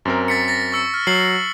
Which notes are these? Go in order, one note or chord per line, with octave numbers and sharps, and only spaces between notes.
F#2 C4 A#4
A6 B6 C#7
A6 A#6
C#6 E6 C#7
F6
F#3 F6 C7 F#7